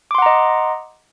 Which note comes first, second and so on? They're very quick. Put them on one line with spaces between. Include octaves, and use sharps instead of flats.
D6 C6 F#5 A#5 D#5